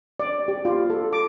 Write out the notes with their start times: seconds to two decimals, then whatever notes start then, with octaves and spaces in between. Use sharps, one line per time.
0.20 D5
0.48 G4
0.65 F4
0.90 A4
1.13 D6